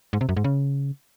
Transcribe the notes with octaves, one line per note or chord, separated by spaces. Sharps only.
G#2
C3
F#2
G#2
C#3